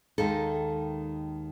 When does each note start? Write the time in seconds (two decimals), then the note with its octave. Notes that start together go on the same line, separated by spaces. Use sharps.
0.18 D#2 D#3 G#3 A4